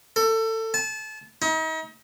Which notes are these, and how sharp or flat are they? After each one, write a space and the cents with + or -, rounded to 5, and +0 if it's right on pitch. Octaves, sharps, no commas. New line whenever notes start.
A4 +25
A5 -30
D#4 +40